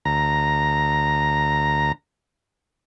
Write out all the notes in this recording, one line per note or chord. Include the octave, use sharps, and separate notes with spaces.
D2 A#5